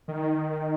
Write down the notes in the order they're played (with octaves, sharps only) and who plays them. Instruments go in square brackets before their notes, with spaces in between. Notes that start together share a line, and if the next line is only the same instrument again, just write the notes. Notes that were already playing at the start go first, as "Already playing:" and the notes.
[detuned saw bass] D#3